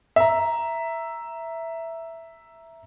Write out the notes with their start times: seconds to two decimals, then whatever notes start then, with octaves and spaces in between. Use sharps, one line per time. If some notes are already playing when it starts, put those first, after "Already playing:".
0.16 E5 A#5